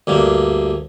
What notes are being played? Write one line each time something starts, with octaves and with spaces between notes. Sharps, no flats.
D2 G2 A#3